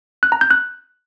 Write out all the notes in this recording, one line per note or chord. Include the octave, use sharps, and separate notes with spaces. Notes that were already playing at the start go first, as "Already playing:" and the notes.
F#6
A#5
G6
F#6